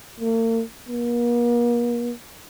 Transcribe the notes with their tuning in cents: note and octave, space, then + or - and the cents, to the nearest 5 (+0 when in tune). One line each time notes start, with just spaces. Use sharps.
A#3 -45
A#3 +40